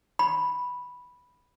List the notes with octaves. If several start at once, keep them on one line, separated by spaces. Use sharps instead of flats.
B5